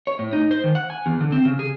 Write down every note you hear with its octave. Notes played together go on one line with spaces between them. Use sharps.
C#5
A2
D#4
C5
D#3
F#5
G#5
E2
D3
C4
C#3
G#4